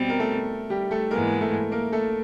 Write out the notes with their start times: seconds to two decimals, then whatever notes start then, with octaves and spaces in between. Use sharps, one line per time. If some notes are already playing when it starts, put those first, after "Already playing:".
Already playing: B2 G3 C4
0.09 A#4
0.19 A3 A4
0.70 G3 G4
0.91 A3 A4
1.11 G#2 E3 G#3 A#3 B3 A#4
1.41 A3 A4
1.72 A#3 A#4
1.92 A3 A4